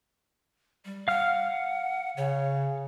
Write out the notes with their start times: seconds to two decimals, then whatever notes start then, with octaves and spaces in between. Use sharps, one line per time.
0.85 G3
1.08 F5 F#5 F6
2.17 C#3 C#5